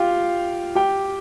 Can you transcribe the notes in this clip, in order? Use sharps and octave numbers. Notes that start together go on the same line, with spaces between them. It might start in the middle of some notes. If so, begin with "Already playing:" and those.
Already playing: F4 G4 F5 G5
G4 G5